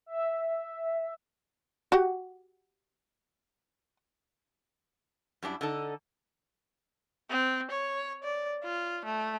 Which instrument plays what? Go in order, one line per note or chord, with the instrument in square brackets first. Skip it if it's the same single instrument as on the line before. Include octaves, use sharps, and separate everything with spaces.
[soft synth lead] E5
[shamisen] F#4 G4 F#5
[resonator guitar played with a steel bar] F#2 G3 D4 E4
D3 D#4 A4
[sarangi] C4
C#5
D5
F4
A3